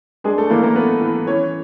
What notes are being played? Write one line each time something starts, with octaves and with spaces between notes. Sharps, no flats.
G#3 D4 G#4
A3 A4
E3 A#3 A#4
A#3 A#4
A3 B3 B4
E3
E3 C#4 C#5